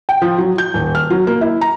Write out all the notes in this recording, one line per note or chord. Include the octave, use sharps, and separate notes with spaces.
G5
F3
F#3
G6
D#1
F6
F#3
A#3
E4
A#5